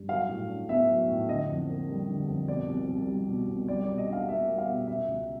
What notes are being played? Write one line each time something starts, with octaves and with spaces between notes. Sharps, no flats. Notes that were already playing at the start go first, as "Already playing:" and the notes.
Already playing: G2
F#3 F5
A2
D4
B3 E5
F#3
A2
D3 D#5
F2
A#3
G3
D3
F2
B2 D5
C2
C2
G3
B2
C2
G3 D5
D5
B2
D#5
D4 F5
A#3 E5
G3
F5
B2
B2 E5
C#2